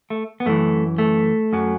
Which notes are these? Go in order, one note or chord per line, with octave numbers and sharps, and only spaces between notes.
A3
B3
F#2 E3 A3
A3
F#2 F#3